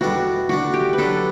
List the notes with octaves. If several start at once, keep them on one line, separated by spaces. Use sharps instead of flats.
E2 B2 G3 D4 F#4 A4
D3 A3 D4 F#4
G4
B4
D3 F#3 B3 D4 A4